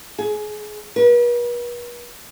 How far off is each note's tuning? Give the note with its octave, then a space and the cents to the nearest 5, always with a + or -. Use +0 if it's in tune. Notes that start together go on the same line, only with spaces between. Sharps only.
G#4 +25
B4 -45